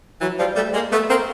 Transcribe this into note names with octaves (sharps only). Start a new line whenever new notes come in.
E3 F#3
F3 G3
G3 A3
G#3 A#3
A3 B3
A#3 C4